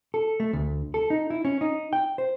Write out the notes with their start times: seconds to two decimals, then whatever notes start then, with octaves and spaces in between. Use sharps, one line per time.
0.14 A4
0.40 A3
0.53 D2
0.94 A4
1.10 D#4
1.30 E4
1.45 C#4
1.61 D#4
1.93 G5
2.18 C5